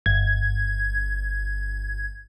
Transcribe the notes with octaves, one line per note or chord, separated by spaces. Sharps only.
G1 G#6